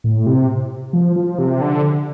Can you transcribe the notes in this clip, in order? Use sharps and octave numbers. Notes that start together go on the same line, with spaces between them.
A2
C3
F3
F3
C3
D3